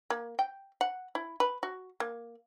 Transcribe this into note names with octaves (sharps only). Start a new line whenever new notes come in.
A#3
G5
F#5
E4
B4
F#4
A#3